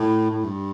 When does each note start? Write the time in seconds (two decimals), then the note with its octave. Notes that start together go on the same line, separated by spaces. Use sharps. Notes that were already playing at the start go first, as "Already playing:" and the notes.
Already playing: A2
0.31 A2
0.44 G2